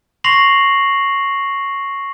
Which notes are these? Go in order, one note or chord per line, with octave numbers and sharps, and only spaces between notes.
C6 C#6 A#6 C7 F7 F#7